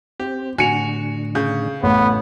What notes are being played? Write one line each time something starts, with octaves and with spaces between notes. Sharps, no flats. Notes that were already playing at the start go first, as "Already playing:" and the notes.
C4 G4
A2 D3 F#4 G#5 C#7 F7
C#3 G6
A1 B3